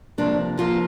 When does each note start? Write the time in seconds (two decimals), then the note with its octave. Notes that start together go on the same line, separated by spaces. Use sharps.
0.18 C3 F3 A#3 D4
0.58 C3 F3 A#3 F4